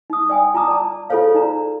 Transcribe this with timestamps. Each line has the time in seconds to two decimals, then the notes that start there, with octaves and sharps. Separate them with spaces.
0.10 D#4 D#6
0.30 D5 G5 G#5 D#6
0.54 F4 A5 A#5 D6 D#6
0.68 D5 A5
1.10 F4 G#4 A4 C5 C#5 F5
1.35 D#4 D5 A#5